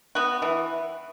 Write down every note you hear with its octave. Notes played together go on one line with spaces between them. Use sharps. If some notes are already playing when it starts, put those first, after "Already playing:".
B3 F#4
E3